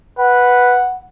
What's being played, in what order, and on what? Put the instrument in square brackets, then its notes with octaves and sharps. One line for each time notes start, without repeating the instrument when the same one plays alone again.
[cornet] B4 [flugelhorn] F#5